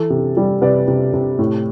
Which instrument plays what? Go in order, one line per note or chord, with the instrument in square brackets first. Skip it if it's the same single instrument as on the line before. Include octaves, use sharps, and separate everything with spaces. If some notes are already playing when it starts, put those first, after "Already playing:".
Already playing: [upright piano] E3 A4
C3
G3
C3 B4 D5
C3
C3
A2